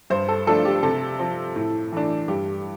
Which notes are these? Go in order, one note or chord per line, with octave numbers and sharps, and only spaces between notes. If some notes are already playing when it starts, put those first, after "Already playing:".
G2 C5
A4
F3 A3 D4 A4
G4
C3 A4
F3 C4
A2
E3 A3 D4
G2 G4